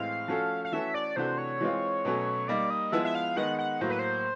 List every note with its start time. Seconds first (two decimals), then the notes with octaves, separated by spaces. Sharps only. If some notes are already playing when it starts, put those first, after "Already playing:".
Already playing: A2 E3 G#3 C4 E4 F5
0.28 F3 A3 C#4 F#4 A4
0.65 F5
0.72 E3 A3 C#4 F#4 A4 E5
0.94 D5
1.16 C3 E3 A3 D4 F#4 C5
1.38 C#5
1.61 E3 G#3 C4 F4
2.05 B2 F#3 A3 C#4
2.48 G3 A#3 D#4 D5
2.70 D#5
2.92 F3 G#3 B3 E4 E5
3.05 E5
3.15 F5
3.36 D#3 G#3 B3 D#4 F#5
3.59 F#5
3.81 A2 F#3 A#3 C5
3.90 B4
3.99 C5